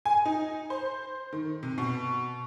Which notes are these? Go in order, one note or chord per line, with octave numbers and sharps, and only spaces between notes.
G#5
D#4
C5
D#3
C3
B2